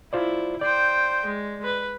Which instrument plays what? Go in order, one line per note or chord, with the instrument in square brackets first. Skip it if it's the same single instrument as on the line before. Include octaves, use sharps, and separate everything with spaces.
[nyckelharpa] E4 [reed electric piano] F4 C5 D5
[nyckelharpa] C5 G5 [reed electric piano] D5
[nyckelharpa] G#3
B4